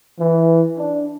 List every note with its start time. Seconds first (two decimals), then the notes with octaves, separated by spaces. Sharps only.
0.19 E3
0.78 D4